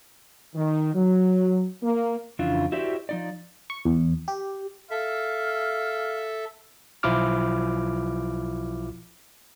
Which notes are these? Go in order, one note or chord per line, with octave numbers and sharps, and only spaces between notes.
D#3
F#3
A#3
F2 C#3 E3 D4 E4 F4
E4 F#4 G4 C5 D5 E5
F3 D#4 D5
C#6
E2
G4
A4 E5 F5
B1 F3 E4 F4 D6 F6